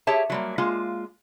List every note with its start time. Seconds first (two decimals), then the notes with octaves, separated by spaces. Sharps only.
0.07 G4 G#4 C#5 E5 A5
0.30 F#3 G3 A#3
0.58 G#3 A#3 F4